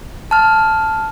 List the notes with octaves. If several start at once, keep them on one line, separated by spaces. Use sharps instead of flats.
A5 F6